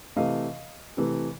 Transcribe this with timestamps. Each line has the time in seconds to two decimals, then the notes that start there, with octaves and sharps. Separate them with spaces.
0.16 C3 E3 A3 D#5 F5
0.97 C3 E3 A3